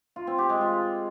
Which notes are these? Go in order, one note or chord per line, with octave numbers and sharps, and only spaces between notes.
F4
C4
G4
G#3
F4